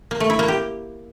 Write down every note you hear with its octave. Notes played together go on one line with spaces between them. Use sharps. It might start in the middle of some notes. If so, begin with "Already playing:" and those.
A#3
A3
E4
A#3
G4